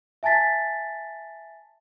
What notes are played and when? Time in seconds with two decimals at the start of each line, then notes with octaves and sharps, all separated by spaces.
0.23 E5 G#5 A5 A6 B6